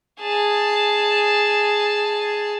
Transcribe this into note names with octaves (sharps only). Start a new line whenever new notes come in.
G#4 A5